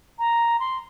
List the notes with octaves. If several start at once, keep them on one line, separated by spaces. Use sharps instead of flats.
A#5
C6